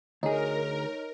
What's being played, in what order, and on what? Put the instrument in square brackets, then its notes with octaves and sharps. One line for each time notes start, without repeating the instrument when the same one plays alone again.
[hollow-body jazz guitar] D2 G#4 [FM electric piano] D#4 [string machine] A#4 [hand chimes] C#5